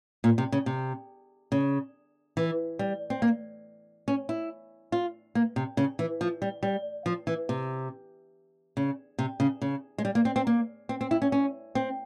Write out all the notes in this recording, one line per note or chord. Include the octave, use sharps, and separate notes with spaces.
A#2
C3
C#3
C3
C#3
E3
G3
C4
A#3
C#4
E4
F4
A#3
C3
C#3
E3
F3
G3
G3
F3
E3
C3
C#3
C3
C#3
C#3
G#3
G3
A#3
C4
C4
A#3
C4
C4
E4
C#4
C#4
C4